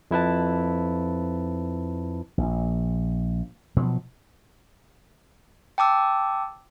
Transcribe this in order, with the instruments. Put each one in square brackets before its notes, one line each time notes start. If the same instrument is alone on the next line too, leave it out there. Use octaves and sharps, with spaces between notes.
[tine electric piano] F2 E4 B4 A5
[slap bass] A#1
B2 F3 F#3
[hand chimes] G5 A5 D6 E6